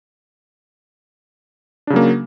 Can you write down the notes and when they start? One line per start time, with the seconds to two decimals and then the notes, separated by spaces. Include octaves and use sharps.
1.87 D4
1.90 C#3
1.93 F#3
1.96 A#3